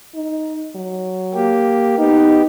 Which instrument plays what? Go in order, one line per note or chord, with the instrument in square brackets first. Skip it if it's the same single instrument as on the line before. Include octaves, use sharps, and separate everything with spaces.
[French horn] D#4
F#3
[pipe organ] A#3 G4
[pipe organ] B3 G4 [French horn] D#4